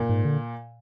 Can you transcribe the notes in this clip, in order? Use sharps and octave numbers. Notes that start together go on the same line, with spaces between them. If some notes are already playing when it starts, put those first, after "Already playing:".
Already playing: A#2
G#2
D3